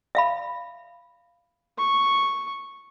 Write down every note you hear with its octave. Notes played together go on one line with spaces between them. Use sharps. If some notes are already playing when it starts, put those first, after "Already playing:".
E5 F5 B5
C#6